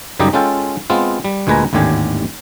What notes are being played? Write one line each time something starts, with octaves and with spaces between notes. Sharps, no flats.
F#2 C#3 G3 D#4 G4 D#5
G#3 C#4 F4 A4 G5
G#3 B3 C4 F4
G3
D2 A#2 G#3 B4 G#5 A#5
G#1 D#2 A2 D3 G4 G#5